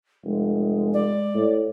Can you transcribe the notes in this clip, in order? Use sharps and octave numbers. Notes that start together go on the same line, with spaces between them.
F1 G#3
D5
A2